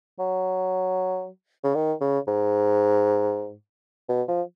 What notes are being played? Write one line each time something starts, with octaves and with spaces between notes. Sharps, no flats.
F#3
C#3
D#3
C#3
G#2
B2
F3